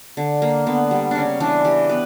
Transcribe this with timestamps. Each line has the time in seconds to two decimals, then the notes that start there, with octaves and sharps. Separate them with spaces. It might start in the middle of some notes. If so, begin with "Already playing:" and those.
0.17 D3
0.42 A#3
0.66 D3 B3
0.91 G3
1.11 C#3 C#4 D4
1.40 E3 D4
1.64 E3 G4
1.89 B3 B4